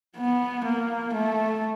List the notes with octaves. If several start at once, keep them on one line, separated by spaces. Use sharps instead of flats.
B3
A#3
A3